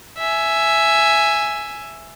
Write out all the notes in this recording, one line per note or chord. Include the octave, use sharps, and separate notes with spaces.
E5 G#5